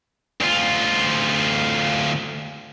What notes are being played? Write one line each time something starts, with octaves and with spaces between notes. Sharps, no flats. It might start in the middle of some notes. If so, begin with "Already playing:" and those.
D2 F4